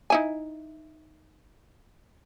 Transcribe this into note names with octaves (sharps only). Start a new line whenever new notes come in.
D#4 E4 G#5